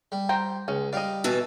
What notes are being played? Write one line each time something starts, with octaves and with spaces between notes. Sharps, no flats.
G3
C5 G5 A#5
C#2 C#4
G3 D5 D#5 F5
B2 E3 A4